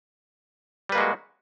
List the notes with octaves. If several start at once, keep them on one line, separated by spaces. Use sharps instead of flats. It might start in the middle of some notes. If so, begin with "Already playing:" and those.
G3 G#3 A#3 F#4 B4